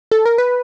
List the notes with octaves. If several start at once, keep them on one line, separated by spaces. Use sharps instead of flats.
A4
A#4
B4